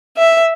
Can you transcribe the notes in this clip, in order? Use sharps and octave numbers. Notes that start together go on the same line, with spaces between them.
E5